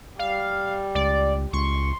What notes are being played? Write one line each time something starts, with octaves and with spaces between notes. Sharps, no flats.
G3 F5
C#2 D5
C#2 C6 C#6